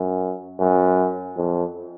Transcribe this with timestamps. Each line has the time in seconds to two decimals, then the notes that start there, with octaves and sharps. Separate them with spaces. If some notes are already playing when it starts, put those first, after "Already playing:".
Already playing: F#2
0.59 F#2
1.37 F2